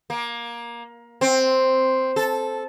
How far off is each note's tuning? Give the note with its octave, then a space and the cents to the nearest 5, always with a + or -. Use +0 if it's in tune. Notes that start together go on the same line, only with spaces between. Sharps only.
A#3 +20
C4 +0
A4 -10